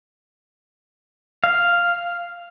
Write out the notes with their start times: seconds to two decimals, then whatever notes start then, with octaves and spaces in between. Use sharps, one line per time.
1.44 F5